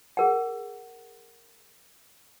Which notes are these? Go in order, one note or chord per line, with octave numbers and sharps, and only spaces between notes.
G#4 A#4 F#5